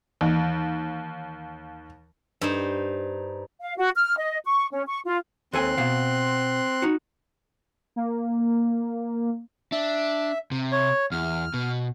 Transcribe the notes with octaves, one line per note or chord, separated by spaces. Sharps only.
D#2 E3
G2 D#4 C5
F5
F#4
F6
D#5
C#6
C#4
C#6
F4
D#2 C4 A4 G#5 C6 F#6
B2 F5
D#4 F#4
A#3
D4 E5
C3
C#5
E2 F6
B2